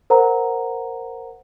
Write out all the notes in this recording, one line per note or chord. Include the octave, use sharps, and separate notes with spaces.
A#4 C5 F#5 A#5